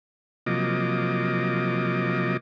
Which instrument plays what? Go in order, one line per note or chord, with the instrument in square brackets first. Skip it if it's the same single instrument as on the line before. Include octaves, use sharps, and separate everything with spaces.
[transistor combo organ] C3 F3 F#3 A#3 D#5 D6